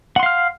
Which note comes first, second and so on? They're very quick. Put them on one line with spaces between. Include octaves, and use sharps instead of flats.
F#5 C6 F5 F6